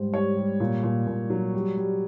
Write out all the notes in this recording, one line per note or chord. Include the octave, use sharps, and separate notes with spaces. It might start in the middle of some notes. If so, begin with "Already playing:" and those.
Already playing: G#2 G3 C5
G3 C#5
G3
A#2
A#2
A#2
F#3
G3
G3